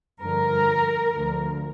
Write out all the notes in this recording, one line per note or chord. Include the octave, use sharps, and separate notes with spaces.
G2 D3 F3 A#4
D2 D3 F3